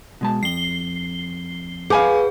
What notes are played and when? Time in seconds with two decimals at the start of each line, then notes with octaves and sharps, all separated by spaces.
0.21 B2 G#3 A5
0.43 F2 C7 G7
1.90 G#4 B4 F5 G#5 D6